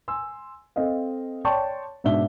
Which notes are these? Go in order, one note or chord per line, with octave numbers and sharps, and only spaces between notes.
G#5 C6 E6
C4 A4 D#5 F5
C#5 D5 G5 A5 C6 C#6
G#2 B2 D4 E5 G7